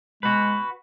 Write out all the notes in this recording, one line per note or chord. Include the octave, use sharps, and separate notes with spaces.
G#3 F#4 B4